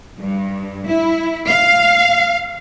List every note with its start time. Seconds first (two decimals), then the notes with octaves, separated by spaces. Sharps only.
0.20 G2
0.87 E4
1.48 F5